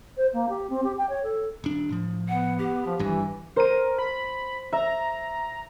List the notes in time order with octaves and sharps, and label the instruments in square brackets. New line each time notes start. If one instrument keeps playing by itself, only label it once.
[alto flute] C5
A#3
G4
C4
G4
G5
C#5
A4
[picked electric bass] D#1 D4
A2 F3
[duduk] B3 [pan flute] F#5
[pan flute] G4
[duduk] F3
[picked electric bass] G#1 G2 [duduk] E3
[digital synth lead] A#4 [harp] C5 D#7
[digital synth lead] B5
[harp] E5 [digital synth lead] A#5